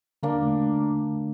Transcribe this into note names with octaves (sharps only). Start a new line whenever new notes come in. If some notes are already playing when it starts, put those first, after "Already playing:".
D3 A#3 D4
A3